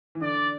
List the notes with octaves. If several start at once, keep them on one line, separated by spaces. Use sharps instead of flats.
E3
D3 D5